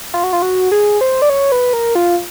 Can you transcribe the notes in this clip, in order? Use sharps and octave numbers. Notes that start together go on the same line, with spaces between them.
F4
F#4
F4
F#4
G#4
C5
D5
C#5
B4
A#4
F4